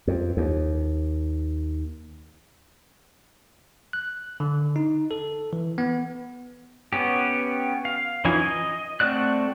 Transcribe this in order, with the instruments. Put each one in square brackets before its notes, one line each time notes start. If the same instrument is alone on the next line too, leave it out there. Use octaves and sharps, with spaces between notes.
[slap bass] F2
D#2
[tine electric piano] F#6
D3
D#4
A4
E3
B3
[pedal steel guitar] B3 C#4 G4
F5
E3 F3 C#4 D#4 G#5
D#5
A3 C4 F#4 D5 F#6